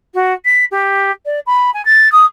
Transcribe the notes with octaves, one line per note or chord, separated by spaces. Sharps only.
F#4
B6
G4
D5
B5
G#5
A6
D#6